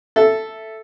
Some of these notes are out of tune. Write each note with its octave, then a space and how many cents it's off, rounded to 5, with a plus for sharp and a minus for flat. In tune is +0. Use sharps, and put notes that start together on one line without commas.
A4 +0 E5 +0